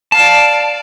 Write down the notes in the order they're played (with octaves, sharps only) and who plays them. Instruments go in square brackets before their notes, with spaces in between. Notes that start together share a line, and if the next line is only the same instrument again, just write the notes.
[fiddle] D5 F5 [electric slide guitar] A5